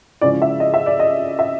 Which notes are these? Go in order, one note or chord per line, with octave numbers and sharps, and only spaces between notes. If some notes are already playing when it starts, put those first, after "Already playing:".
C#3 F3 G#3 C#4 E4 D5
E5
D#5
E5
D5
D#5
E5